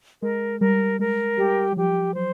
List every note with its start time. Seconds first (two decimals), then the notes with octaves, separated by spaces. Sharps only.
0.22 G#3 A#4
0.61 G3 A#4
0.99 G#3 A#4
1.38 G3 G4
1.72 F#3
1.76 F3 G4
2.15 F#3 C5